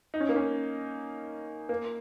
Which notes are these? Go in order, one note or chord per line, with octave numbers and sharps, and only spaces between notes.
D#4
C#4
A#3
C#4
A#3